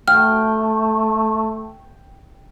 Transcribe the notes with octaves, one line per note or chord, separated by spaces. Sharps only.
A3 G5 F6